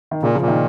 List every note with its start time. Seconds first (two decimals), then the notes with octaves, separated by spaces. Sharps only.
0.11 D#3
0.22 A#2 C#3
0.35 C#3 F3
0.41 A#2
0.48 D#3